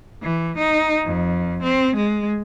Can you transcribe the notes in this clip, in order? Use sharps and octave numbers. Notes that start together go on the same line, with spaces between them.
E3
D#4
F2
C4
G#3